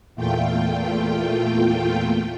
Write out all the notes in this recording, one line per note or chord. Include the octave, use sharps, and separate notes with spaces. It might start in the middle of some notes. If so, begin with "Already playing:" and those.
E2 A#2 A3 F4 G5